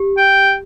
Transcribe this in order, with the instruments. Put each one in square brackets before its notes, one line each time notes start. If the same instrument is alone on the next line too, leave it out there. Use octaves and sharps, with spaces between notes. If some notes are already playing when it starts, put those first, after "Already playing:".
Already playing: [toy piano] G4
[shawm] G5